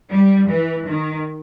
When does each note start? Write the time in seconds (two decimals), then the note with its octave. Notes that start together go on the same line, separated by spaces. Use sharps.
0.11 G3
0.49 E3
0.88 D#3